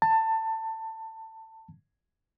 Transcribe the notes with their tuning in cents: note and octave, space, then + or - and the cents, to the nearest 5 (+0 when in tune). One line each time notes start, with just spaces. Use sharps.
A5 +20